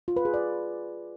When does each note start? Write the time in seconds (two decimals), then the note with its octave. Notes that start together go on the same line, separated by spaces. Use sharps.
0.08 F4
0.16 B4
0.25 G#4
0.34 D5